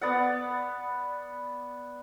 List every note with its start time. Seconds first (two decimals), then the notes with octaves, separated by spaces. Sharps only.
0.01 B3 D5 F#5